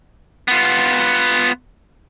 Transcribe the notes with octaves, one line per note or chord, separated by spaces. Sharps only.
B3 F4